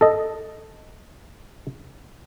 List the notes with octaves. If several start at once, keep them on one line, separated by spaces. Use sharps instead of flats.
A4 D#5